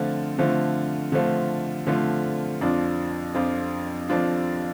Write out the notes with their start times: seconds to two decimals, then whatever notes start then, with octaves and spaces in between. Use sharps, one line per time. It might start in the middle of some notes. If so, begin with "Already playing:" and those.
Already playing: D3 F3 A3 C4 F4
0.38 D3 F3 A3 C4 F4
1.12 D3 F3 A3 C4 F4
1.87 D3 F3 A3 C4 F4
2.61 F2 F3 D4 F4
3.35 F2 F3 D4 F4
4.09 F2 F3 D4 F4